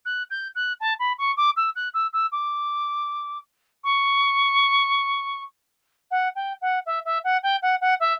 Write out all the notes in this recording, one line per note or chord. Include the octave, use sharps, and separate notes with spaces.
F#6
G6
F#6
A5
B5
C#6
D6
E6
F#6
E6
E6
D6
C#6
F#5
G5
F#5
E5
E5
F#5
G5
F#5
F#5
E5